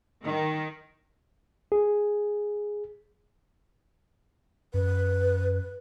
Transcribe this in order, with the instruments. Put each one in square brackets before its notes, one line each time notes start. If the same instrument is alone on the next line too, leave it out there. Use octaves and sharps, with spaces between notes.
[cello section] D#3
[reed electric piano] G#4
[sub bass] F#2 [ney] B4